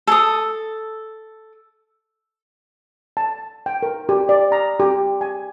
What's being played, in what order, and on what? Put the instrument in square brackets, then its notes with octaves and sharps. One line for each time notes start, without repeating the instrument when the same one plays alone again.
[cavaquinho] A4 D#6
[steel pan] A5
G5
A#4
G4
D5
A#5
G4
G#5